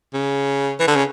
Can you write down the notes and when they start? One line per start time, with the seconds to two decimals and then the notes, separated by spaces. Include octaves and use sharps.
0.14 C#3
0.80 E3
0.87 D3
0.96 C#3